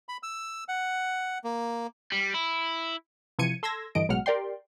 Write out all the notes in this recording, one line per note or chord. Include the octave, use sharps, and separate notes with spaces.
B5
E6
F#5
A#3
G3
E4
C3 E3 F3 G#6 C#7 D#7
A4 C6 E6 G#6 A#6
G2 D3 E3 D#5 D7
A1 B2 F#3 G#3 F#5 F6
G4 A#4 D5 G5 C6